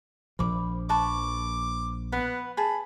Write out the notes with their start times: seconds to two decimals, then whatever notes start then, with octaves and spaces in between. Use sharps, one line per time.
0.39 A#1 F3 B5 D6
0.89 B4 A5 C#6 D6
2.12 B3 B4 F#5
2.57 G#4 A5 B5